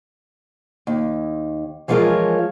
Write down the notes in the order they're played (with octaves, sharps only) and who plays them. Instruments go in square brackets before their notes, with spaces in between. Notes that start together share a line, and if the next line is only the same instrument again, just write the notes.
[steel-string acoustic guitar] D#2
E3 F3 G#3 F4 A#4 C#5